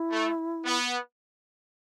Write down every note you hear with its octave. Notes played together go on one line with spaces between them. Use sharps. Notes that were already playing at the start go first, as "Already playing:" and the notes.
Already playing: E4
A3
B3